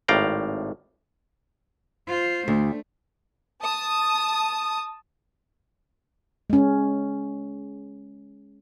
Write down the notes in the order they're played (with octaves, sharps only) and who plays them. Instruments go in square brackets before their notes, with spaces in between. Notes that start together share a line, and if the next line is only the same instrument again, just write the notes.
[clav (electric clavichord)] G#1 A2 D5 F5 G5 A#5
[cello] F4 C5
[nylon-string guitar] D2 [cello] A3
[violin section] A5 D#6
[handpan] G#3 C#4